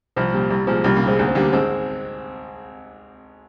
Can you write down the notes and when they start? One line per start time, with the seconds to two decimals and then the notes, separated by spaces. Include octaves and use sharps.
0.16 C2 F3
0.33 A#2 G3
0.50 C2 G3
0.67 A#2 F3 G#3
0.84 C2 G3 A#3
0.96 G3 A#3
1.02 A#2
1.07 G#3 C4
1.19 D2 A#3
1.28 C4
1.35 D3 G3 A#3
1.53 G#1 G#3 C4